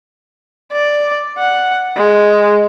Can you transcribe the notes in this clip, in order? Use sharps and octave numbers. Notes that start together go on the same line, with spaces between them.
D5
F#5
G#3